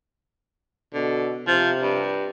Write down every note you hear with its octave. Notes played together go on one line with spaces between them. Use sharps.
B2 D3
C3 F3
G2